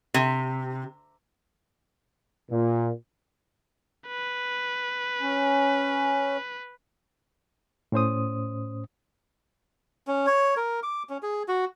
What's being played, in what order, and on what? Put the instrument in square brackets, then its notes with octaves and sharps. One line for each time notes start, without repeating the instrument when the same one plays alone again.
[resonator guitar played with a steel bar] C3
[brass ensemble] A#2
[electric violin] B4
[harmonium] C#4
[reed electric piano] A2 C#4 C5 D#6
[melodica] C#4
C#5
A#4
D6
C#4
G#4
F#4